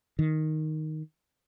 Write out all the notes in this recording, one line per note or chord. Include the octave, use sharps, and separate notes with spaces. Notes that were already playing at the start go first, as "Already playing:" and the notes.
D#3